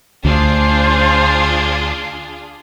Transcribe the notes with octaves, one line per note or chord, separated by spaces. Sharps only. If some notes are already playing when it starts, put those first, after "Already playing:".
D2 D4 F4 G#4 C5